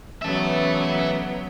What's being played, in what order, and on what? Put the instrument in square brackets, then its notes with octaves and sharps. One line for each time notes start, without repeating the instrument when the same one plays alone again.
[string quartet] C#3 F#3 B3 [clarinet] E3 [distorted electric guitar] E5 A5